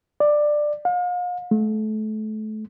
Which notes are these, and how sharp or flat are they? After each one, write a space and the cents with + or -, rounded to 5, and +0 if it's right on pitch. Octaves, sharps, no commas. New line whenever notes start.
D5 +15
F5 +40
A3 -30